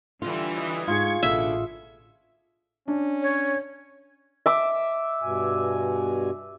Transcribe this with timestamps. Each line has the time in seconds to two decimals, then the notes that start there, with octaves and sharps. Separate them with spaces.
0.22 D3 E3 G3 F4
0.58 D#5
0.87 G#2 F4 G#4 C#6 G#6
1.23 A1 B2 D3 E5
2.88 C#4 D4
3.22 C#5
4.46 E5 D6
5.22 G2 B2 G#5